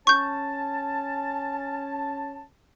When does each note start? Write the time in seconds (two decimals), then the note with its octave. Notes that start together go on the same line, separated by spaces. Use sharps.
0.07 C#4 A5 C#6 G6